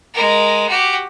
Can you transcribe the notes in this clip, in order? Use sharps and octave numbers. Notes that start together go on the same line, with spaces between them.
G#3 A#4
F#4 G4